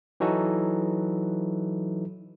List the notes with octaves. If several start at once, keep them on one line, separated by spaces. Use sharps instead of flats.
E3 F#3 D#4 F#4 A4